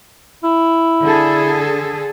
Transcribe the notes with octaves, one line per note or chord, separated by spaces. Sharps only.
E4
D3 G#4 A4